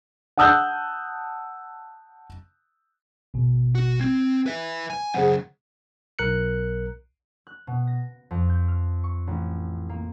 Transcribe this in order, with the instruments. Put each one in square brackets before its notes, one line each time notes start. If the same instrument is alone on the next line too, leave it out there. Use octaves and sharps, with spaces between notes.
[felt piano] F#5 A5 D#6 E6 F#6 G6
[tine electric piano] G#1 B2
[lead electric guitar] F#4
[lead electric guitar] C4 [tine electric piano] G#6
[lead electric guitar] B4 E5
G#5
[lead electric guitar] F#2 C#3 [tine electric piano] G#4 C5 F#5
[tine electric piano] B1 A#4 F#6 C#7
[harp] F#6
B2
A#6
F2
G6
F6
C#6
A1
A#3